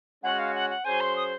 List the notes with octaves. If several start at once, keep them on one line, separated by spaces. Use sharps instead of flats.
G#3 C#4 F#4 F#5
F5
F#5
F#5
F#3 C#4 G#4 C5 G#5
C6
D#6